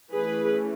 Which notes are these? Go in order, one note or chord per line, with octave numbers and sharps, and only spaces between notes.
E3 A3 C#4 G#4 B4